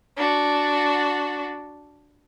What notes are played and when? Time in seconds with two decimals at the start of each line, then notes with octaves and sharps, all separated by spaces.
0.17 D4 F#4